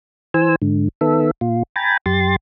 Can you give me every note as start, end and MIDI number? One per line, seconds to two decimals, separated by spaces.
0.34 0.55 52
0.34 0.55 72
0.34 0.55 80
0.34 0.55 88
0.62 0.88 44
0.62 0.88 50
1.01 1.31 51
1.01 1.31 59
1.01 1.31 69
1.01 1.31 76
1.41 1.63 46
1.41 1.63 65
1.76 1.97 79
1.76 1.97 80
1.76 1.97 82
1.76 1.97 83
1.76 1.97 93
2.06 2.36 42
2.06 2.36 67
2.06 2.36 84
2.06 2.36 93